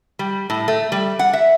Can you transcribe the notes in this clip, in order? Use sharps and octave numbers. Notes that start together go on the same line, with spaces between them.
G3
A2
A3
G3
F#5
E5